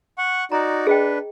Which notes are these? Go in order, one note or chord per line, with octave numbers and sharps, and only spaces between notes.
F#5 C#6
D#4 F#4 D5 A#5
D4 G#4 B4 D#5 G5